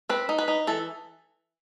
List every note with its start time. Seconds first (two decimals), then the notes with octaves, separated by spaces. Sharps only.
0.09 C4 B4
0.29 D#4
0.39 B4
0.48 D#4
0.67 E3 A4